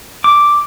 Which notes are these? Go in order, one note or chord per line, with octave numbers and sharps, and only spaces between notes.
D6